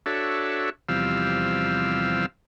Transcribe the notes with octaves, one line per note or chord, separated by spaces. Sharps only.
D4 F#4 A4 C#5 E5
E2 C3 F3 G3 F5 E6